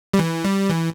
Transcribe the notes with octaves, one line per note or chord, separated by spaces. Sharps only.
G3
E3
G3
E3